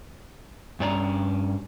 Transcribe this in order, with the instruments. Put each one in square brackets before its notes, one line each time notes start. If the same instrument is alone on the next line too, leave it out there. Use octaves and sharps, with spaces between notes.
[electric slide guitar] G2 C#4 D5 A5 A#5